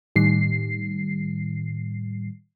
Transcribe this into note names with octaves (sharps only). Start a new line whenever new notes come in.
A2 D#3 G3 C7